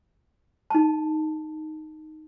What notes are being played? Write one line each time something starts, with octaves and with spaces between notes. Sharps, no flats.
D#4 A5